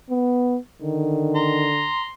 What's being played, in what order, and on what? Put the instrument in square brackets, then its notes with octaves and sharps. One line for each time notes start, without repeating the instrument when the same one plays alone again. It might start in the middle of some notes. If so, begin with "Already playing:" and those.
[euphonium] B3
[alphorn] D3 [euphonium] D#3
[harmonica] A#5 C6